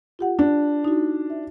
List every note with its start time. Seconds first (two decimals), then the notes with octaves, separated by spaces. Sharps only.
0.19 F4 G4 F#5
0.39 D4
0.84 D#4 E4 F#4
1.30 E5